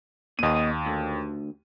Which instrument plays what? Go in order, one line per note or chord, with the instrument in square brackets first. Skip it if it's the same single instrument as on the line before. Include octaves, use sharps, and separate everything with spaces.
[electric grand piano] D#2 D#7 [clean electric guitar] A#2 D#5
[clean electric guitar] D2